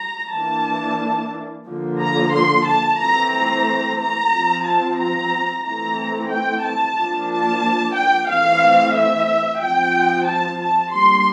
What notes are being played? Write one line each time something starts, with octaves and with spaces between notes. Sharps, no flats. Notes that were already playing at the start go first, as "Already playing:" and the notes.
Already playing: A#5
E3 A#3 D4 A5
D3 F3 A#3
A#5
C6
A5
E3 A3 C4 A#5
A#5
A#5
F3 C4
A5
A#5
E3 A3 C4 A#5
G5
A5
F3 A#3 D4
A5
G5
E3 A3 C4 F5
E5
F3 C4 G5
A5
A5
G3 A#3 D4 C6